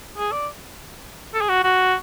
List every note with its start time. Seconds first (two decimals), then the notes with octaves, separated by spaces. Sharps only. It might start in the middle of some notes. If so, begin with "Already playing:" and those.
0.18 G#4
0.32 D5
1.34 A4
1.41 G#4
1.49 F#4
1.64 F#4